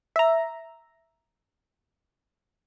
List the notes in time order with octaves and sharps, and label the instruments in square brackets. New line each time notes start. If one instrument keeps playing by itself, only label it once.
[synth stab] E5 A#5